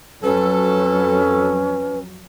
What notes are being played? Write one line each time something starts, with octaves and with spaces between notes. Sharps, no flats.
F2 F#3 C#4 A4 B4